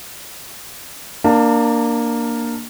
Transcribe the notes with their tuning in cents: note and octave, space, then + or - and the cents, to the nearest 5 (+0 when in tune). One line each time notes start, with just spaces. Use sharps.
A#3 +0 D4 +15 A5 +30